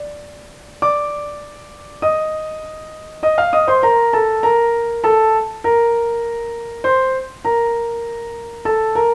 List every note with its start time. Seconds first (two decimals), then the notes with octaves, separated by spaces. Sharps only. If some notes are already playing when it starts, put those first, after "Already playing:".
Already playing: D5
0.82 D5 D6
2.02 D#5 D#6
3.23 D#5 D#6
3.38 F5 F6
3.53 D#5 D#6
3.68 C5 C6
3.83 A#4 A#5
4.13 A4 A5
4.43 A#4 A#5
5.04 A4 A5
5.64 A#4 A#5
6.84 C5 C6
7.45 A#4 A#5
8.65 A4 A5
8.95 A#4 A#5